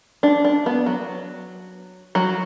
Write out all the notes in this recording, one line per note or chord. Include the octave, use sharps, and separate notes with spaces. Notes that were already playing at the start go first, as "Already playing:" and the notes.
D4
D4
B3
F#3
F#3